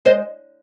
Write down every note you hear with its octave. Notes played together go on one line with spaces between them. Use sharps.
G#3 C5 D#5